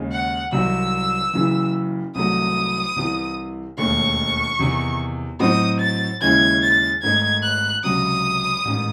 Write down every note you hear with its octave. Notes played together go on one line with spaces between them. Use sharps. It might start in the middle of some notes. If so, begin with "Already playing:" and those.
Already playing: D#2 C#3 G#3
F#5
C2 C3 D#3 F#3 E6
F#1 F#2 C#3 E3
C2 C3 D#3 F#3 A3 D#6
C2 C3 E3
E1 D#2 D#3 A3 C#6
E2 C3 D#3
A2 F#3 C4 D#4 F#4 D#6
A6
D#2 C#3 G#3 C#4 E4 G#6
A6
G#1 G#2 D#3 A3 D#4 G#6
F#6
C#2 C3 F#3 D#6
A1 G#2 D#3